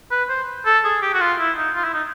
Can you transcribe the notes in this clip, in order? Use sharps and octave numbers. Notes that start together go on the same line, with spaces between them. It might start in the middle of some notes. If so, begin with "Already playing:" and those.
B4
C5
A4
G#4
G4
F#4
F4
E4
D#4
F4
E4
D#4